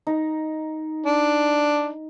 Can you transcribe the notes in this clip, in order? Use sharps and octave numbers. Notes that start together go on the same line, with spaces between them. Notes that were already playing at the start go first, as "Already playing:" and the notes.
D#4
D4